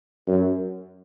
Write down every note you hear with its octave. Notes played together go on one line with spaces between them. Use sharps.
F#2